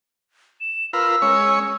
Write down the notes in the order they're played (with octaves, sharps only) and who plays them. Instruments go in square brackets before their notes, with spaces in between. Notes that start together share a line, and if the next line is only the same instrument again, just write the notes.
[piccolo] E7
[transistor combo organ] F4 A#4 B4 [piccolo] E6
[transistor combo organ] G#3 C#4 C#5